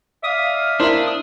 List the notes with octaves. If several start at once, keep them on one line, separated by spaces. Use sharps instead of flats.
D5 E5 F5 D#6
D4 E4 A#4 C5